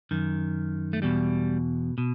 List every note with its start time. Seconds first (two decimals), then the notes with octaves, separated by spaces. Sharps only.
0.11 F#2 D#3
0.93 A3
1.02 E2 B2 G3
1.98 B2